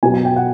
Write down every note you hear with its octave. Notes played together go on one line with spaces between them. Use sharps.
B2 F#3 G#5
G#5
G5
F#5